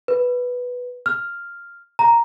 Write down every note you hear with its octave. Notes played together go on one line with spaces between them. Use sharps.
B4
F6
A#5